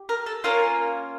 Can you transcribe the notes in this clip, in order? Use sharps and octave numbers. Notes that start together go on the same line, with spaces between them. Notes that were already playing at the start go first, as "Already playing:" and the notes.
Already playing: G4
A#4
A4
A#3 C#4 F4 A#4